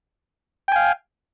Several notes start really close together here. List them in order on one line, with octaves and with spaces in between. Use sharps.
G5 G#5 F5